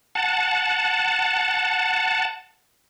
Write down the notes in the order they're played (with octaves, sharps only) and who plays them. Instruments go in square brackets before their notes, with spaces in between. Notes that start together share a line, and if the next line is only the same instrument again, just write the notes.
[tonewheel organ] F#5 A5